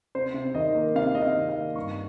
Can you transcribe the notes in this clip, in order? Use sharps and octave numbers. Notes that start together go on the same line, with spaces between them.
C3 C5
C3
D#3 D#5
A#3
C3 F5
C3 D#5
F5
D#3
F5
A#3
G2 C#6